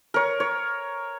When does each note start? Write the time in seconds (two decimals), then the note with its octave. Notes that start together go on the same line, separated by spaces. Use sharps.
0.14 A#4 C#5
0.40 C#5